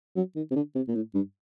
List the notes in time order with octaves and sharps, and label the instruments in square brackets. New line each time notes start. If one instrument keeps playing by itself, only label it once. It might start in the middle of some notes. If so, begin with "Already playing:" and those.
[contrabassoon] F#3
D#3
C3
D3
C3
A#2
A2
G2